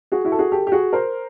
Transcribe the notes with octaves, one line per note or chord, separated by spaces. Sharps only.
F#4 G#4
E4 F#4
A4
F#4 G#4
G4 A4
G4
F#4 G#4
A#4 C5